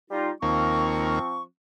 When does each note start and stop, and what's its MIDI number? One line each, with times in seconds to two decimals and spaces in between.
0.11 0.31 55
0.11 0.31 63
0.11 0.31 65
0.42 1.19 39
0.42 1.43 53
0.42 1.19 58
0.42 1.43 60
0.42 1.43 85